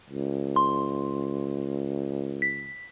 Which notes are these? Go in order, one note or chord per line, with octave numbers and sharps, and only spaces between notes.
C#2
C6
B6